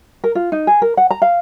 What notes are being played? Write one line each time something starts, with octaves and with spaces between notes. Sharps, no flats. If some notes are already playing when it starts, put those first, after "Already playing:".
A#4
F4
D#4
G#4
A#4
F#5
A#5
F5